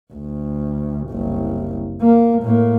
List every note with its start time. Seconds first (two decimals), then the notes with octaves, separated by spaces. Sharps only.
0.13 D2
1.09 F#1 C2
2.01 A#3
2.42 A2 A#3